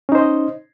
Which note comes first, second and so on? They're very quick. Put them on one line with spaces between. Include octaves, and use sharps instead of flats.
C#4 D#4 C5 D#5